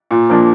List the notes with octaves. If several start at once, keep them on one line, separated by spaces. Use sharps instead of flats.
A#2
F3 A#3 D4